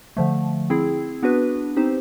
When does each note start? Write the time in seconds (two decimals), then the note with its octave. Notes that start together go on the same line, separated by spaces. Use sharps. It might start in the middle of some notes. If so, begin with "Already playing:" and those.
0.17 D3 F3 A3
0.70 C4 E4 G#4
1.23 B3 D4 F#4 B4
1.76 C4 D#4 G4 C5